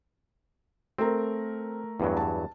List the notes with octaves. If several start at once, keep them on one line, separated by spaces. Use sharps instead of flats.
A3 C4 A#4
E2 G2 F#3
A5